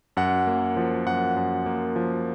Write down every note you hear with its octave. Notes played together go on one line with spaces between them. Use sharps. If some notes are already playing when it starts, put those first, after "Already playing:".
F#2 F#5
A#3
F3
F#2 F#5
F#2
A#3
F3